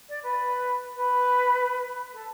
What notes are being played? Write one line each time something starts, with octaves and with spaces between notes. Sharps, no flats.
D5
B4
B4
A4